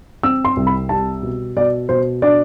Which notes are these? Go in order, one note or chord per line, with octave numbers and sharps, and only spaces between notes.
C4 E6
C6
C2
B5
G3 A5
B2
B2 D5
B2 C5
D4 D5